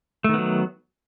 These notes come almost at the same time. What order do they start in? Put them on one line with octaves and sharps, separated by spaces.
A3 D#3 B3 F#3